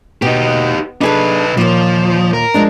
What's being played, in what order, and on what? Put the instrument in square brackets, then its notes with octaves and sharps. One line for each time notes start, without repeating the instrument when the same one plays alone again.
[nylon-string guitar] B2 [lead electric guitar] D#4 G4
[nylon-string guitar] D4 G#4 A4 [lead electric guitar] D#4 B4
[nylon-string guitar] D#2 A#2 [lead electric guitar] F3
[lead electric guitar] A#4
[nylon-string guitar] F3 G#3 D4